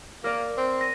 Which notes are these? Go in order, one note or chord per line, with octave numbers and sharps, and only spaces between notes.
A#3 A#4 D5
C4
A#6 D#7